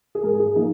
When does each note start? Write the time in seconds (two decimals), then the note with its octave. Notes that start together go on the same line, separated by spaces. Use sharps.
0.15 G#4
0.23 G#2 G#3 A#4
0.40 G#4
0.55 F3 A#3 D#4